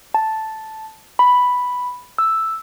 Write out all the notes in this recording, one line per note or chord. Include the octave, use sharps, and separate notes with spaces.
A5
B5
E6